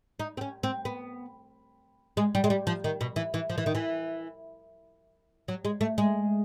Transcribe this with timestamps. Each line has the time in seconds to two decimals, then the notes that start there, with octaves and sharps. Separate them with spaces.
0.19 D#4
0.37 C4
0.41 C#4
0.63 C4
0.85 B3
2.17 G#3
2.35 G3
2.44 G#3
2.50 G3
2.67 F3
2.84 D#3
3.01 B2
3.16 E3
3.34 E3
3.50 F3
3.58 E3
3.66 D#3
3.75 E3
5.48 F#3
5.65 G#3
5.81 A3
5.98 G#3